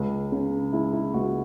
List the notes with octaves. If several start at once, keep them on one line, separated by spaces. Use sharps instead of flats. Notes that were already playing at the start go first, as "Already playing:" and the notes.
Already playing: C#2
C#3
G#3 E4
E4
C#2 F#4